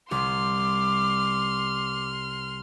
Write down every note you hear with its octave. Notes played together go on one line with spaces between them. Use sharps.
C2 C6 D6 F6